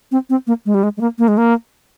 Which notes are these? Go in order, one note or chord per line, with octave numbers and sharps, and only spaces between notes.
C4
C4
A#3
G#3
G3
G#3
G#3
A#3
A#3
G#3
A#3